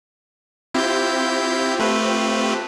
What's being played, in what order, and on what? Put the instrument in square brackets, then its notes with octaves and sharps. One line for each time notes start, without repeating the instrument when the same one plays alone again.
[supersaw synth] C4 F4 G4 [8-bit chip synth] E4 G6
[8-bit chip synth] A3 B4